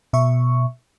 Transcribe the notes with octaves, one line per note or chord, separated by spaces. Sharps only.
B2 E5 C#6